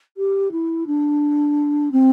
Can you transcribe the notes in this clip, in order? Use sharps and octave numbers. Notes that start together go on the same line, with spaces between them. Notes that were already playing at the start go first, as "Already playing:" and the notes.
G4
E4
D4
C4